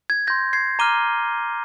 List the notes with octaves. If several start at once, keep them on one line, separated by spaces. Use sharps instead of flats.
G#6
C6 G6 A#6
G#6 C7
A#5 D6 F6 D#7 G7